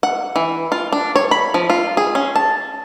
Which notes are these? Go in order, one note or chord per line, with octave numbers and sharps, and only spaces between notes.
F#5
E3
F4
D4
C#5
B5
F3
F4
G#4
C#4
A5